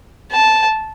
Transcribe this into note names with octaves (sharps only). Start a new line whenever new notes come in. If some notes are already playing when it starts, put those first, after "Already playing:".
A5